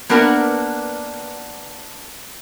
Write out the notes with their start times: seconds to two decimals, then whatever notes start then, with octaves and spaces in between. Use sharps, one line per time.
0.09 A#3 B3 D4 A#4 B4 F#5